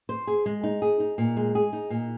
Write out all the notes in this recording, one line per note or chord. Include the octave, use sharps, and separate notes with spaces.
C5
G#4
G#3
D#4
G#4
D#4
A#2
G#3
G#4
D#4
A#2